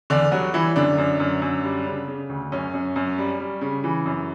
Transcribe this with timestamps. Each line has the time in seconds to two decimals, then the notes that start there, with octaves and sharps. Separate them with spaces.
0.10 E2 D3 D4
0.32 F#3 G3 F#4
0.54 E3 G3 E4
0.76 F#2 D3 D4
0.98 F#2
1.20 F#2
1.42 F#2
1.64 G3
1.86 C#3
2.08 C#3
2.29 D2
2.52 F#2 C#4
2.74 F#2
2.96 F#2
3.18 G3
3.40 G3
3.61 C#3
3.84 E3
4.06 F#2